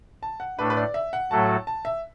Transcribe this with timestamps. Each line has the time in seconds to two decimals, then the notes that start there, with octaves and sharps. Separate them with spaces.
0.23 A5
0.40 F#5
0.58 A2 A3 D4 B4
0.70 B4
0.77 D5
0.94 E5
1.13 F#5
1.31 A2 F#3 A3 F#4 A4 A5
1.67 A5
1.85 E5